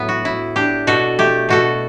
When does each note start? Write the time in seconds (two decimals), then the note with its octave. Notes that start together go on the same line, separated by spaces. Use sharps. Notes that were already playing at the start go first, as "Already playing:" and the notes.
Already playing: A2 F#3 B3
0.09 F#4
0.25 E4
0.56 D4 G4
0.87 B2 F#4 A4
1.19 A3 G4
1.49 B2 F#4 A4